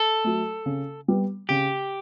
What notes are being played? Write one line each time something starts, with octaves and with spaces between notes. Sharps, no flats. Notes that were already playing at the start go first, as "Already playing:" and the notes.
Already playing: A4
F#3 A3
C#3
G3 B3
C#3 G4